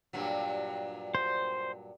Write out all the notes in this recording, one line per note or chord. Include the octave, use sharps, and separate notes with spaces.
G2 A#2 F#3
C5